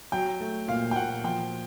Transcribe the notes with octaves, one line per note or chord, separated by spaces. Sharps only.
F#3 G5
A3
A#2 F5
G5
A#2 F#5
F3 G5